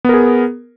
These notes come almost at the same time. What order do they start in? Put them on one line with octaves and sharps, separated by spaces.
B3 A#4 G#4